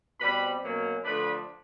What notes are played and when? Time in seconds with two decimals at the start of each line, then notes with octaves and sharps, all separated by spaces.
0.20 B2 G3 C4 B4 B5
0.63 B2 F#3 A#3 C#4
1.05 D3 F3 A3 D4 B4 B5